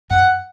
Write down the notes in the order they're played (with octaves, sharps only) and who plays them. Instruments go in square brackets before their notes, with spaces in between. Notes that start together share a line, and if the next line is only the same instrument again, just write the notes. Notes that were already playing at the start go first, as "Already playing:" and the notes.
[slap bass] F#2 [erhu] F#5